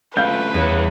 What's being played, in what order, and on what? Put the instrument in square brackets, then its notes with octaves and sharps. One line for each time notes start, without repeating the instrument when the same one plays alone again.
[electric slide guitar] A3 C#4 F4 [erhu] B4 [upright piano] F5 G6
[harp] E2 [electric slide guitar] G3 G#4 C#5